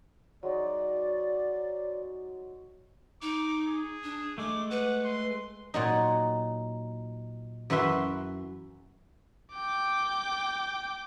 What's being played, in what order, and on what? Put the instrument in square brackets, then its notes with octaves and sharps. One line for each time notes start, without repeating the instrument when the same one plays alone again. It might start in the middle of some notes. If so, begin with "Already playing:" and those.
[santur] F#3 G#3 D#4 [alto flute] D5
[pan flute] D#4 [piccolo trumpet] D6
[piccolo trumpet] G#4
[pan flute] D4
[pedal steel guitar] G#3 A3 [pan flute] D6
[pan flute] B4 [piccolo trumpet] F#5
[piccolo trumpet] C6
[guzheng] A#2 F#3 D#4
F#2 E3 F#4 B4 E5 C6
[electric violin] G5 D6